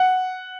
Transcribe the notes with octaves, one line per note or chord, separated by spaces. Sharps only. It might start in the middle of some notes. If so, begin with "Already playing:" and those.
Already playing: F#5